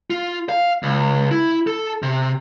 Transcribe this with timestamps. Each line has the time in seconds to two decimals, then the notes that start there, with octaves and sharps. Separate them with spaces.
0.10 F4
0.49 F5
0.83 C#2
1.31 E4
1.67 A4
2.03 C3